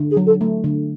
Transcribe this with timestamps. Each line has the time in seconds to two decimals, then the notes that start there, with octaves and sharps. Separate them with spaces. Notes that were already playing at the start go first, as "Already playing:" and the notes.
Already playing: D3
0.09 G#4
0.17 F#3
0.26 A4
0.41 A3
0.64 D3